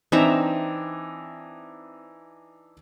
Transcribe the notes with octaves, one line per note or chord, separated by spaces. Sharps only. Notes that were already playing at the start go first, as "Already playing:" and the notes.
E3 C4 D4 D#4 E5 A#5